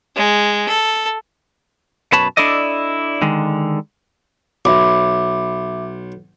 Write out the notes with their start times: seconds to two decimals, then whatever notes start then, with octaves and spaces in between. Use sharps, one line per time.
0.16 G#3
0.69 A4
2.12 F#2 B2 B4 C#5 A5 B5
2.37 D4 E4 A4 D5 D#5
3.22 D3 D#3 G#3
4.65 B1 E5 B5 D6